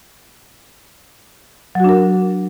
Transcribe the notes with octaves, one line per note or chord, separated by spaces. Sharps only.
F#3 D4 F#4 A#4